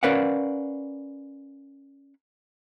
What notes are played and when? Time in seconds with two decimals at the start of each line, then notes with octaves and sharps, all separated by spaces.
0.03 C#4 A#4 B4 D5 F5 F#5